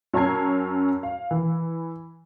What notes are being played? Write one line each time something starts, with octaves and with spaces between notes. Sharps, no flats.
F#2 C#4 A5 A#5 G#6 C7
F5
E3